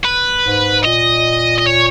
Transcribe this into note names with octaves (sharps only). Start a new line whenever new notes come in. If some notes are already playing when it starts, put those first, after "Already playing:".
B4
G#2
A#2 D#5
D#5
C#5